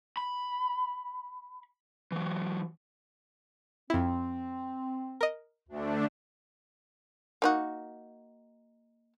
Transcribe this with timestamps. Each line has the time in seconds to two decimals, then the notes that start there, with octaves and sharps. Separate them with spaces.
0.17 B5
2.12 E3 F#3
3.90 F2 C4 E4
5.21 A#4 D#5
5.69 D2 D3 A3 D4
7.42 A#3 D#4 F#4